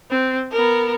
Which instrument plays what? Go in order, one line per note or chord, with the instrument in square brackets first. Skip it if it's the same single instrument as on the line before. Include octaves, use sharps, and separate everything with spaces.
[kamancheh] C4
B3 A#4